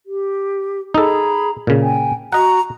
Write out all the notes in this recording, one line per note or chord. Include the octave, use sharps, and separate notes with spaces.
G4
D#4 G#4 A4 A#5 B5
A#2 C#3
G5 G#5
F#4 D#5 F#5 A#5